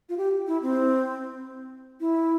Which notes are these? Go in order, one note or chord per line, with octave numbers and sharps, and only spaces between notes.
F4
G4
E4
C4
E4